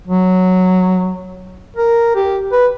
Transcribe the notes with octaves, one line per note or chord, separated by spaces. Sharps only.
F#3
A#4
G4
B4